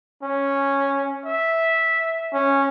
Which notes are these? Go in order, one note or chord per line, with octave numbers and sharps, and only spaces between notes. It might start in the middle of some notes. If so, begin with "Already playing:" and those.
C#4
E5
C#4